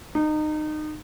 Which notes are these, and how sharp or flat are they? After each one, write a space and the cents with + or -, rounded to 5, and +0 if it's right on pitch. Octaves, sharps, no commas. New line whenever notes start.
D#4 -25